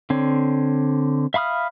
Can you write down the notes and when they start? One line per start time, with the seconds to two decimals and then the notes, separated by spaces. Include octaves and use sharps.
0.10 D3 C4 C#5
1.34 E5 F5 B5 D#6 F6